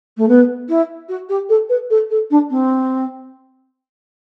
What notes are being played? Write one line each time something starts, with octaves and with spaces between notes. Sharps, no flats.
A3
B3
E4
F#4
G4
A4
B4
A4
A4
D4
C4